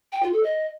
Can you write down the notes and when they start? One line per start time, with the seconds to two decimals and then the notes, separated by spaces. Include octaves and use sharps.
0.12 G5
0.23 F4
0.33 A4
0.43 D#5